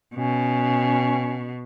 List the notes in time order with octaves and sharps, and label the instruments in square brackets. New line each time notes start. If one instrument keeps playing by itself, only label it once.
[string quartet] B2 [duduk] C#4